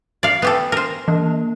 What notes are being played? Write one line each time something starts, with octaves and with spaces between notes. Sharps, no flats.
D5 F5
B3 G4 A4
A#4 C5
E3 A#3